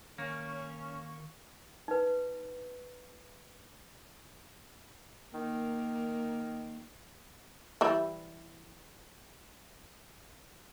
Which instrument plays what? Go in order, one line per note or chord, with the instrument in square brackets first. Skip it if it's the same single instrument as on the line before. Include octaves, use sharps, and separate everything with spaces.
[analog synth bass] D#3 [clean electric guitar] A#3 [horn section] C#4 [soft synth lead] C#6
[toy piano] D#4 B4
[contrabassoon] D#3 [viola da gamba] A#3
[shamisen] E3 G3 E4